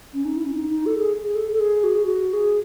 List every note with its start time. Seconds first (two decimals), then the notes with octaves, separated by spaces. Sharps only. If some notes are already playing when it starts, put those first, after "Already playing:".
0.14 C#4
0.25 D#4
0.37 E4
0.46 C#4
0.53 D#4
0.70 D#4
0.86 A4
0.98 G#4
1.23 G#4
1.35 A4
1.54 A4
1.60 G#4
1.84 F#4
1.95 G#4
2.06 F#4
2.33 G#4